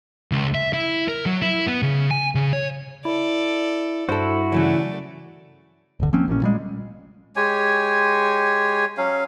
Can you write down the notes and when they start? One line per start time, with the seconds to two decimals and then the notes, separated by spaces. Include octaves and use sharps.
0.32 C#2
0.55 E5
0.73 E4
1.08 A#4
1.26 F#3
1.42 E4
1.67 B3
1.82 C#3
2.11 G#5
2.35 C#3
2.53 C#5
3.05 E4 A4 D5
4.09 G2 E4 F#4 A4 C5
4.52 C#3 E3 F#3 A3 D5
6.00 D1 G1 D3
6.13 F3 A#3 C4 C#4
6.28 A1 A#2 D#3 C#4
6.42 A#2 G3 G#3
7.36 G#3 G4 C#5 G#5
8.98 F#3 C#4 F5